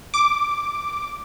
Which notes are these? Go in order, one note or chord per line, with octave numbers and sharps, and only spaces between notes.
D6